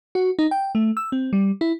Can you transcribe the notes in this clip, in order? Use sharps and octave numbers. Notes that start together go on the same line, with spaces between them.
F#4
D#4
G5
A3
E6
C4
G3
E4